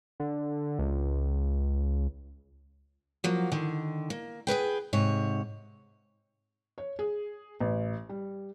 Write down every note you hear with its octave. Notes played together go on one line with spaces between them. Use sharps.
D3
C#2
F3 F#3 A#3
D3 D#3
A#3
G#4 A4 B4 G5
G#2 C3 C#5
C#5
G#4
A1
G3